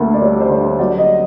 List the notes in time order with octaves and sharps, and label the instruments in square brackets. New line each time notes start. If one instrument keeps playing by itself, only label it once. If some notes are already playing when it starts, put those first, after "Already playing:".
Already playing: [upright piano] D2 A#3 A4 A#4
D5
G3 C#5
C5
D3 C#5
F#3 D5
D#5